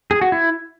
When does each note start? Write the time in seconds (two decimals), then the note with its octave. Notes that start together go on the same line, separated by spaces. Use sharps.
0.11 G#4
0.21 F#4
0.32 E4